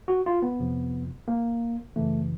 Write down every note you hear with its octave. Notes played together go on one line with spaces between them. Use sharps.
F#4
F4
B3
F2 C3 F3
A#3
F#2 C#3 E3 A3